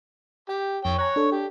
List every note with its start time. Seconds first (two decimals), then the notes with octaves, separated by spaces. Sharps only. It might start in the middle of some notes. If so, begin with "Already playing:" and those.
0.49 G4 G5
0.85 F2 C#5 G5
0.98 C#5 G#5 A#5 F#6
1.16 D4 A4
1.32 G4